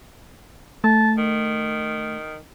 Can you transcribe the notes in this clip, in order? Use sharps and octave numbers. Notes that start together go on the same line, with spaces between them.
A3 A5
D#3